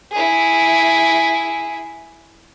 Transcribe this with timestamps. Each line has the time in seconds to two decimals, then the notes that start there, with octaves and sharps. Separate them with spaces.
0.12 E4 G#4